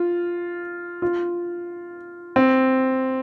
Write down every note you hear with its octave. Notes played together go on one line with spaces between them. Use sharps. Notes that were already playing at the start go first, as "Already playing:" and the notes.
Already playing: F4
F4
C4